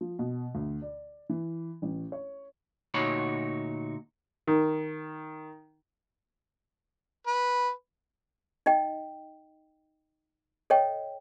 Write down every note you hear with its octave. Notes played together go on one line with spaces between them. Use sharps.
F3
B2
D2
D5
E3
A1
C#5
D2 A#2 D#4 F#4 C#5 B5
D#3
B4
D#4 D#5 G5
A4 C#5 D#5 G5